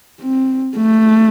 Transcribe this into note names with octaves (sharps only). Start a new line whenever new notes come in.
C4
A3